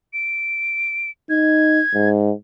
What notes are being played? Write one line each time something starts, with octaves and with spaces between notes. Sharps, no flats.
D7
D#4 G#6
G#2